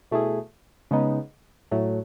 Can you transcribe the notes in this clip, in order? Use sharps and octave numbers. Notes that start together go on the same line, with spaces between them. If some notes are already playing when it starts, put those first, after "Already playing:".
B2 A3 E4 G#4
C#3 G#3 B3 D#4
A2 F#3 A3